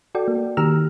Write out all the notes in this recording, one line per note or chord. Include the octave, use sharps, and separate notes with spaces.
F#4 A4 D5 G5
A#3
D#3 A#3 G4 A#5 E6 F6